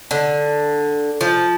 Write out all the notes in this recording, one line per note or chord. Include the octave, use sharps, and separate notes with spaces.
D3
F3